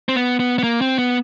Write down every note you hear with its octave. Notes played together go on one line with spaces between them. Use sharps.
C4
B3
B3
B3
A#3
C4
B3